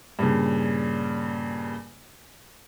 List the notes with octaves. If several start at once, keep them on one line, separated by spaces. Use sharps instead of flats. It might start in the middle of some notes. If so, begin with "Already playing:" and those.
G2 A#2 C#3